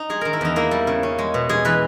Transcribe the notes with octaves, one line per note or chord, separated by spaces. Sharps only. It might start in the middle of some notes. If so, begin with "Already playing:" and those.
Already playing: D#4
G#3 G#4
D#3 A#4
E4
E2 D#4
A#3 E4
G3
C#3
C#4
G#3
B2
G#3 G#4
E3 B4